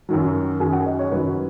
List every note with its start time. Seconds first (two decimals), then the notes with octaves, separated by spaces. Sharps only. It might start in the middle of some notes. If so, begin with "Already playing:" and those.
0.09 F#2 D#3 F#3
0.60 F#2 D#3 F#3 G#4
0.73 F#5
0.86 D#5
0.99 C#5
1.12 F#2 D#3 F#3 B4